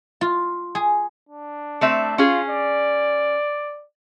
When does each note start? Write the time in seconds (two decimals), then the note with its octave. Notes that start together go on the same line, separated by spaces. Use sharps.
0.21 F4
0.75 G#4
1.29 D4
1.81 A3 C4 E5
2.18 C#4 F4 G#4
2.50 D5